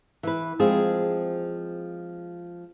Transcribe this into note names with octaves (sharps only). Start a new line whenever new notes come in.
E3 B4
F3 G#3 C4 G#4